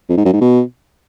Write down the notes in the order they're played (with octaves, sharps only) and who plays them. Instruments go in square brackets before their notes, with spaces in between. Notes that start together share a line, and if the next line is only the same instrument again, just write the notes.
[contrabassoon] F2
G#2
F#2
G#2
B2